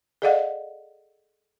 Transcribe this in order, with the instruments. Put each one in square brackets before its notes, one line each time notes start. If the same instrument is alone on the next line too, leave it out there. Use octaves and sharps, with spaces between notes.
[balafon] G#4 A4 D5 D#5 F5 F#5